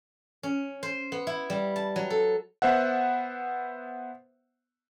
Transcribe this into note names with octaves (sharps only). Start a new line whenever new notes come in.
C#4
C5
B3
E4
G3
A5
F#3
A4
B3 C5 E5 F#5